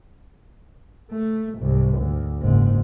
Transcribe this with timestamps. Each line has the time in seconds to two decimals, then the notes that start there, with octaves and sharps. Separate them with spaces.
1.11 A3
1.59 C2 G#2
1.98 D2
2.41 F#1 G#2